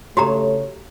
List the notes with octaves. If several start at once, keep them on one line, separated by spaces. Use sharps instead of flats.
C#3 A3 F#4 G4 C#5 A#5